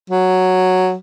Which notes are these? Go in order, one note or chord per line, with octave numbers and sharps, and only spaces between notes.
F#3